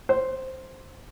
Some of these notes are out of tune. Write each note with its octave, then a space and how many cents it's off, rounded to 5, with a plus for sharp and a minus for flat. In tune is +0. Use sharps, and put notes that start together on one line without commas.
C5 +0